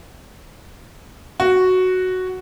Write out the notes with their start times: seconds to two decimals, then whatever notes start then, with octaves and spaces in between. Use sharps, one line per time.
1.40 F#4